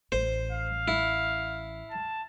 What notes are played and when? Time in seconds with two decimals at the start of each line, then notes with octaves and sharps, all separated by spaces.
0.12 A1 C5
0.52 F5
0.88 E4
1.91 A5